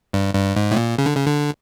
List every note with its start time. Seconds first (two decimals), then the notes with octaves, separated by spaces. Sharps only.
0.13 G2
0.35 G2
0.56 G#2
0.71 A2
0.76 A#2
0.98 C#3
1.06 D3
1.15 C#3
1.27 D3